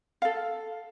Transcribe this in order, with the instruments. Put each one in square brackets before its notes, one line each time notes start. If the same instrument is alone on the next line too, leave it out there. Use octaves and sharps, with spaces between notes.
[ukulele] A4 F5